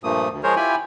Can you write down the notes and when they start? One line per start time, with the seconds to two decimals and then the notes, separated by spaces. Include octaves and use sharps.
0.04 G2 A#2 F3 A3 A#3 D#6
0.31 D2
0.43 F3 G#3 G#4 A#4 C5 C#5
0.56 E4 F4 G4 G5 G#5 B5